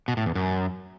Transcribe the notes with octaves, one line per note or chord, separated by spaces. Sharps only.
B2
A2
E2
F#2